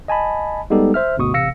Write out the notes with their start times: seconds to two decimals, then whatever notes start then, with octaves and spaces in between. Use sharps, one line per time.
0.08 D#5 G#5 A5 B5
0.70 G3 G#3 B3 D#4 G4 A4
0.94 C5 E5 F6
1.17 G1 D2 B2 C#6 D#6
1.33 A1 C3 F5 E6 A#6 C#7